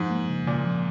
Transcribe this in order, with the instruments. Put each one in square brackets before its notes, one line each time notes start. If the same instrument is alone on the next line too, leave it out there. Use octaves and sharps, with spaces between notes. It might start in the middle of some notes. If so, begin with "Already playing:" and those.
Already playing: [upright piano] G#2 [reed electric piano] F3
[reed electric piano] A#3
C#3
[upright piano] A#2 [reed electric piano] C#3
[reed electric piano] F3